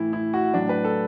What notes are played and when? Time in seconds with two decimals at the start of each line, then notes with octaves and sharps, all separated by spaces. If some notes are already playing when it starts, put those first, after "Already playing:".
Already playing: A2 E3 E4
0.13 E4
0.34 F#4
0.54 A2 F#3 D4
0.69 B4
0.85 A4